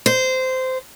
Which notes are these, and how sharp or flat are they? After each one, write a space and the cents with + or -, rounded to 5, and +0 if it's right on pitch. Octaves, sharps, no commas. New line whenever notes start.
C5 -15